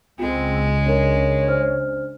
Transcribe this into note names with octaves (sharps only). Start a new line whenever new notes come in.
C#2 C#3 G#3 C4 F4
D4 A#4 C#5
D4 C5 F6